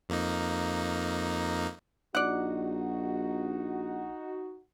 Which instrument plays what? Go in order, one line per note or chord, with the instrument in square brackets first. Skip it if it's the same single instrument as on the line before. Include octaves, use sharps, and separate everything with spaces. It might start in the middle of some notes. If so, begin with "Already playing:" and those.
[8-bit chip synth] F2 A#3 D#4
[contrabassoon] A#1 [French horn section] D#4 F#4 [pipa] D5 F#5